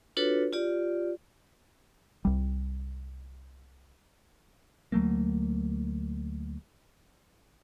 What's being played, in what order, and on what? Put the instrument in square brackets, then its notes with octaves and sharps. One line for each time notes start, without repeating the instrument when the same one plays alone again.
[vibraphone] D4 F4 F#4 A4 B4 C#5
F4 G4 D5
[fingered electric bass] C2 G3
[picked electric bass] D2 F#3 A3 A#3